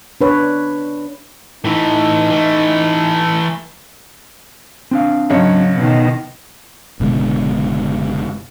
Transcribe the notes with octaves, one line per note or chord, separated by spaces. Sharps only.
D4 B4 C#5
A2 E3 D#4
E3 A3
C4 D4 F5
G#1 C#3 F#3 C#5
B2 D#3
F#1 B2 D3 G#3